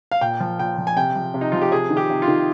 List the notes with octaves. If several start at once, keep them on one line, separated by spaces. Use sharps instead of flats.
F5
A#2 G5
F3
A#2 G5
F3
G#5
C3 G5
F3
C3
D#4
F3 F4
G4
C3 G#4
D#3
G4
C3
F4
D#3